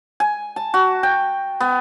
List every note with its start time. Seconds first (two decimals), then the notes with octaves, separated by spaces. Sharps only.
0.20 G#5
0.56 A5
0.74 F#4
1.03 G5
1.60 B3